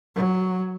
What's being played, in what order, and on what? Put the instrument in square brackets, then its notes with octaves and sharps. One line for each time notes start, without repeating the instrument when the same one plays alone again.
[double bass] F#3